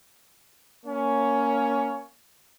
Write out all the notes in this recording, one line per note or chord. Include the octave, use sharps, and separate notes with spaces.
A#3 C#4 C#5